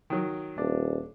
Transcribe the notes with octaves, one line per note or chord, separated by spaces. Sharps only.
D#3 F#3
D#1 D4